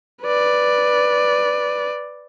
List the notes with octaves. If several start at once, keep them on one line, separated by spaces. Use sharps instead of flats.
B4 D5